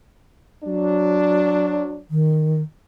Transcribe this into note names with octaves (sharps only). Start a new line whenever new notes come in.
F#3 D4
D#3